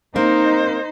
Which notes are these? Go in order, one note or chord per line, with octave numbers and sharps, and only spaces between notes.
A#3 C4 D#4 C5